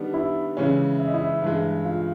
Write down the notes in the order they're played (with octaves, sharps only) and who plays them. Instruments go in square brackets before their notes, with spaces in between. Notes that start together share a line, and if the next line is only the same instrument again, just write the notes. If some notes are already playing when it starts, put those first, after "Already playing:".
Already playing: [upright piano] D#3 G3 B3 D4
[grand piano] E4 E5
[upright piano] C#3 E3 G#3 C#4
[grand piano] E5
D#5
E4 E5
[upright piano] G2 E3 G#3
[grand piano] F4 F5